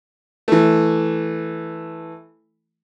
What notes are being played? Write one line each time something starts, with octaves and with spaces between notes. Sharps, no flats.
E3 A3